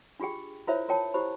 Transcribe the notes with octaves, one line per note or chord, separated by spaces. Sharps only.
D4 F4 G4 G#4 G5
E4 F4 A#4 C5 C#5 E5
F4 A#4 C#5 G5 A5
E4 G4 C5 B5